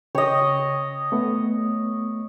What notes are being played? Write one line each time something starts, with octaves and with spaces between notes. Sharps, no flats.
C#3 C#5 D#5 G5
A3 B3